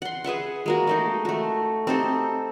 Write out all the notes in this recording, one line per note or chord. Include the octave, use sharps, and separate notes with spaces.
F#5 C6
G#4 B4 E5 F#5
G#3 A#3 F#4
G#3 A3 D#4
A3 F#4
C4 D#4 G4 A4